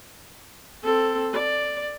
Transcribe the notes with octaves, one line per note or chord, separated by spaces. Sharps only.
C4 A4
D5